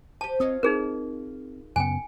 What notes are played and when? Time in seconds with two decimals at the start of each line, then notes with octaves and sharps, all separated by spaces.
0.21 G4 C5 A5
0.40 C4 F4 C#5 D#5
0.63 C4 D#4 G#4 A#4
1.76 F#2 C#3 B3 G5 G#5